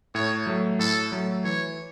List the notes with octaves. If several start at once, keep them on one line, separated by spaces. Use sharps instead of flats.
A2 C#5
F#3 A3
A2 A4
F#3 A3
E3 C#5